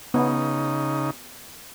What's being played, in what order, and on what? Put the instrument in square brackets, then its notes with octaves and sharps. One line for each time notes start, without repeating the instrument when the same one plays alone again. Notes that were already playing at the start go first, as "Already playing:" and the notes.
[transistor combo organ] C#3 D#4 [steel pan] B3